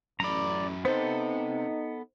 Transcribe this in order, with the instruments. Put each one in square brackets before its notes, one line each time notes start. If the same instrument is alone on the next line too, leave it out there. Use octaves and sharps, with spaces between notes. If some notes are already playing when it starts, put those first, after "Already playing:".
[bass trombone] A1 [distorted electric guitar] F#2 B5 [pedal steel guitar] D5 A#5
[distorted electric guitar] C3 [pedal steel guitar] B3 A4 [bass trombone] D#4 [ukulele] C5